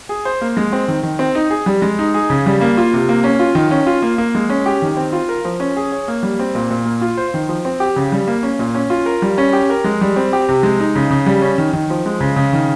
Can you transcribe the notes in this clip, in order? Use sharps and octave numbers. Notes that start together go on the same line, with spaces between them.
G#4
C5
A#3
G#3
C4
D#3
D#3
C4
D#4
G#4
G3
G#3
D#4
G#4
C#3
G3
A#3
F4
C3
A#3
C#4
F4
D#3
C#4
F4
A#3
A#3
G#3
C#4
G4
D#3
C4
F4
A#4
F3
C#4
G#4
C#5
A#3
G3
C4
A#2
A#2
A#3
F4
C5
D#3
F3
C4
G4
C#3
G3
A#3
C#4
A#2
C#4
F4
A#4
G3
C#4
G4
A#4
G#3
G3
C4
G4
C3
G#3
D#4
C#3
C#3
G3
C#4
D#3
D#3
F3
G#3
C#3
C#3
D#3